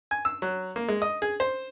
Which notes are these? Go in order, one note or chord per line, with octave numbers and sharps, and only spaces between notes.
G#5
E6
F#3
A#3
G#3
D#5
G#4
C5